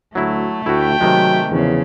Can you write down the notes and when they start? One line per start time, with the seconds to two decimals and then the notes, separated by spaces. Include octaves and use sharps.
0.15 D2 F#3 A3 E4
0.66 D2 E4 F#4 G5
1.01 C3 D#3 F#3 G#3
1.51 E2 C#3 F3